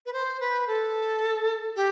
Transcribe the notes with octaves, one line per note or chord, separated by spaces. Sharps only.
B4
C5
B4
A4
G4